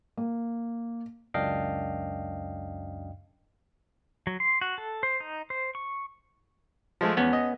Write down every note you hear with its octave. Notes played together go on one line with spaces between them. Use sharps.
A#3
C#2 F#2 D4 D#5 F5 G5
F#3
C6
F#4
A4
C5
D#4
C5
C#6
F3 G#3 A3
E2 B3 C#4
D#5